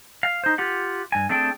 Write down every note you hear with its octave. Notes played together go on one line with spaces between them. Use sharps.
F5
D#4 C5
F4 G4 F#5
G2 G#5
A3 C4 D4 G#4 G5